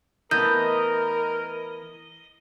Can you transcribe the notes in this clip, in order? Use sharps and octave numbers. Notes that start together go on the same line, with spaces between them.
E3 A3 B3 A#4 D#5 G6